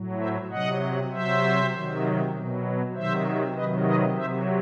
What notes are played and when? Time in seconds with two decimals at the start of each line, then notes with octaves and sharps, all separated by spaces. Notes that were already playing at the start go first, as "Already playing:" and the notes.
Already playing: A2 F#3
0.19 C5 E5
0.50 C3 F#3 D#5 F#5
1.11 C3 F#3 C5 E5
1.72 C3 D#3 F#3
2.34 B2 F#3
2.94 C3 D#3 F#3 C5 E5
3.55 C3 D#3 F#3 B4 D#5
3.86 B4 D#5
4.16 C3 F#3 C5 E5